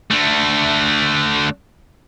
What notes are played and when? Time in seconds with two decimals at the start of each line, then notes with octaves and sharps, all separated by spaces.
0.11 D3 A3